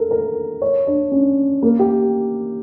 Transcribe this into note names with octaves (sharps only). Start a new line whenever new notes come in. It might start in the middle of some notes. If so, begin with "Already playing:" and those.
Already playing: A4 A#4
A#4
C#5
D4
C#4
A#3
G4